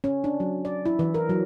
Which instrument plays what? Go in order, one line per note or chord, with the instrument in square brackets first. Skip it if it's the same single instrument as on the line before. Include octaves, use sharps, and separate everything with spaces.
[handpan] C#4
D4
F#3
D5
E4
E3
A#4
F#3